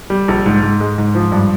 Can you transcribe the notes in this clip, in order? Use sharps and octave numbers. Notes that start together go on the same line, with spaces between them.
G3
A#1
G#2
G#2
G#3
G#2
F3
G2